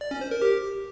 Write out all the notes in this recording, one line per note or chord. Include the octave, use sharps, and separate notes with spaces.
D5
C#4
C5
A#4
G4